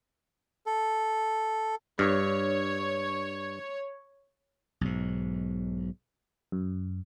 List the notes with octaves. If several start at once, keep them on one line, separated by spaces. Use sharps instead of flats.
A4
G2 C#5
B1 G#2
F#2